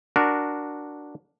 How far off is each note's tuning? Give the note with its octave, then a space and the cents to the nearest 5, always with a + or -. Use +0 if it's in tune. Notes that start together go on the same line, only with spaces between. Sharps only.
D4 +0 F#4 +0 A#4 +0